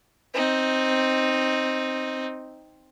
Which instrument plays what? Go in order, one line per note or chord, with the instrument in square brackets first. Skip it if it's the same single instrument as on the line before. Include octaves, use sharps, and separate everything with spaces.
[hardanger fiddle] C4 D#4